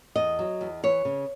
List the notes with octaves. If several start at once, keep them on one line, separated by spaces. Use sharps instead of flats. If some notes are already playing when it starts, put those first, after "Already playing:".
E2 D#5
F#3
E2
E3 C#5
C#3